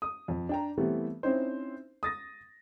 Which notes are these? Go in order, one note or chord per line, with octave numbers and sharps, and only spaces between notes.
D#6
F2
D4 G5 A#5
E3 G3 A3 B3 C4
C4 C#4 D#4 E4 C5
D#6 A6 A#6